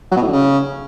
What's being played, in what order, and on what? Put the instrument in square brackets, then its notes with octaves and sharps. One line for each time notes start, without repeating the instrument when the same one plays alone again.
[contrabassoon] F#3
B2
A2
D3
C#3